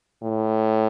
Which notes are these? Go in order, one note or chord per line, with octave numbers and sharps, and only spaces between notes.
A2